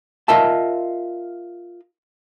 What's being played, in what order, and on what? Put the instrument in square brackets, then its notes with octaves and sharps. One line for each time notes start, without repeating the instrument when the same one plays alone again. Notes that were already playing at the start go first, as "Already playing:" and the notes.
[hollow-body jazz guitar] F4 A#4 D#5 E5 A5